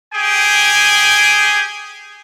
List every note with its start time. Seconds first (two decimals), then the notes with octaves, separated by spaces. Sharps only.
0.14 G4 G#4 G5 G#5